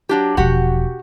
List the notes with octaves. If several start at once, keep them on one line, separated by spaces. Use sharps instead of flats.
F#3 D4 G4
E1 F3 F#4 G4 F#5